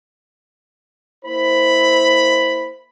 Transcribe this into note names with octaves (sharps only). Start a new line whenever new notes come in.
A#3 E4 C5 B5